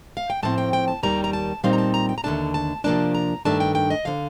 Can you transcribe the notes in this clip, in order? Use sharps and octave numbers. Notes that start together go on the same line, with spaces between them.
F5
G5
A2 F3 C4 A5
G5
G5
A5
D#2 D#3 G3 A#5
A#5
A5
A#2 G3 C4 D#4 F5
A#5
A5
A#5
G5
A#5
D#2 D3 A3 D4 A5
A5
C3 F3 A#3 D4 A5
A#5
G2 D#3 A3 D4 A5
G5
G5
D#5
D3 F3 F5